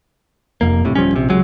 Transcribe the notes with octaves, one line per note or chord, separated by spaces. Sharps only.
F1 F2 A#3
D1 A2 C3
D1 F3 G3 C#4
A#1 C3
C#2 F#3 G#3